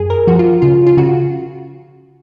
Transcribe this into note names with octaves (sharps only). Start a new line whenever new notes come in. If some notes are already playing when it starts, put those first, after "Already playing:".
Already playing: F#2 G#4
A#4
F3 F#4
F4
C#3 F4
F4
C#3 F#4